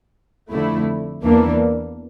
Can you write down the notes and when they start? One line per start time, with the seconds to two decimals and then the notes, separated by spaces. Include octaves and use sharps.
0.51 F2 D3 A3 E4
1.25 E2 E3 A#3 D4